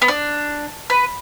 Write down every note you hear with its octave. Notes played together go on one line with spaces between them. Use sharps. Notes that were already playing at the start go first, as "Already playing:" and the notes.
B3
D4
B4